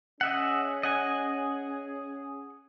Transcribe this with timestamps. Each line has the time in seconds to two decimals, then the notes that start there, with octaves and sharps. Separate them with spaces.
0.21 C#4 G#4 D#5 E5 F#5
0.83 D#5 F#5 G#5